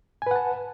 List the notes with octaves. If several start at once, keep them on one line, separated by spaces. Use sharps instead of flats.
B4 F#5 G#5 A5